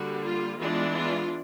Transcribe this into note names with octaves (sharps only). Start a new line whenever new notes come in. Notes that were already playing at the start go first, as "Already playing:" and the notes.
Already playing: D3 G3 A#3 F#4
F4
E3 G#3 B3 D4 F4
F4